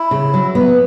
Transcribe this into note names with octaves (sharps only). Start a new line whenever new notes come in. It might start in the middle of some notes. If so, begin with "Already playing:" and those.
Already playing: E4
C#3
F#3
B3